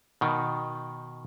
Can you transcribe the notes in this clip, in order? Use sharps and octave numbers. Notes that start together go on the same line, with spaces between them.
B2 D#3